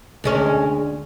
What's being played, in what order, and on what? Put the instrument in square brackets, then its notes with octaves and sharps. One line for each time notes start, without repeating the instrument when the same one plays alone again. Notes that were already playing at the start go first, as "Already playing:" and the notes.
[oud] D2 G#3 C#4